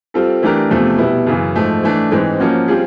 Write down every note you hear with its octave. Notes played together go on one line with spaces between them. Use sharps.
G3 C4 F4 A4
E3 A3 D4 G4 A#4
E2 C3 F3 A3
B2 G3 B3 E4
F#2 C#3 E3
G#2 F3 A3
E3 A3 D4
G#2 E3 G#3 C4
F3 A#3 C#4 F#4
G3 C4 F4 G#4